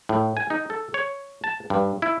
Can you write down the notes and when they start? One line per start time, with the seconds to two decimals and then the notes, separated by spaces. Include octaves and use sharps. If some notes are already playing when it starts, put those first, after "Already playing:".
0.09 A2
0.37 G#5
0.50 D#4
0.70 A4
0.94 C#5
1.44 A5
1.70 G2
2.02 E4